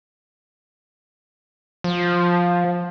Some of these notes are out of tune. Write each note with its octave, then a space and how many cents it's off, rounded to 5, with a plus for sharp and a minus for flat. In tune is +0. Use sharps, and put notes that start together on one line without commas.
F3 +10